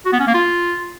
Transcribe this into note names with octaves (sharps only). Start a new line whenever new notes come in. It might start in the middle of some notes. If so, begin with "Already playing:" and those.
F#4
B3
C#4
A#3
F4